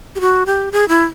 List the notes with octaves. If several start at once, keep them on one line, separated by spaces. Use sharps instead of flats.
G4
F#4
G4
G#4
E4